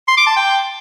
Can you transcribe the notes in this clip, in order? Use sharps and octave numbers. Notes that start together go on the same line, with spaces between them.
C6
D6
A5
G5